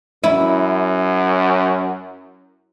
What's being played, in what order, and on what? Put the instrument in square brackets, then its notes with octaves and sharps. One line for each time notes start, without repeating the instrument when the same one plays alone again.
[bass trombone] F#2 [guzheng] E4